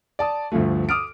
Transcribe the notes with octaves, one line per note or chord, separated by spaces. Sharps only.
D5 A5 D#6
D2 G2 F3 A3
D6 D#6 F6 D7